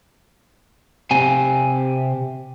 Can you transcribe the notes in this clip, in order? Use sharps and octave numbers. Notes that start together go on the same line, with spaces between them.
C3 C4 G4 G#5